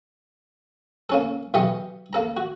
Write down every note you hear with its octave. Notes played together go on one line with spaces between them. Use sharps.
A#3 C#4 A4
B1 E3 G4 D#5 C#6
A#3 A4 A#5
F#4